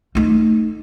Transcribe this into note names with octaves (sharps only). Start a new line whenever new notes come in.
A3 D#4